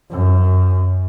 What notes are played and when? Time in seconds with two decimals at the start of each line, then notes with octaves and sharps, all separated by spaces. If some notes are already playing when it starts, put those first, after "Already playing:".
0.11 F#2